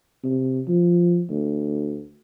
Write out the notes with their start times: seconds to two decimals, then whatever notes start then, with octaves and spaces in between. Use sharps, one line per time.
0.24 C3
0.68 F3
1.30 D2